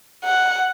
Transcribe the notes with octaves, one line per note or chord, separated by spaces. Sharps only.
F#5